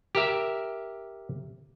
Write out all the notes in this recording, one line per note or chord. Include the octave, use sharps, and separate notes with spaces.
G4 A#4 E5